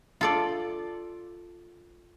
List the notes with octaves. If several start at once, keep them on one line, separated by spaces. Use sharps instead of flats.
F4 A4 D5